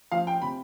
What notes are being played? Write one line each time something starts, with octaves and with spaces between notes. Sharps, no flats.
F3 F5
G5
C3 B5